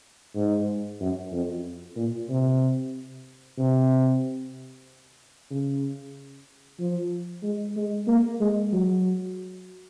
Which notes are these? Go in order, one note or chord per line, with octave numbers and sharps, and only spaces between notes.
G#2
F#2
F2
A#2
C3
C3
C#3
F3
G#3
G#3
A#3
G#3
F#3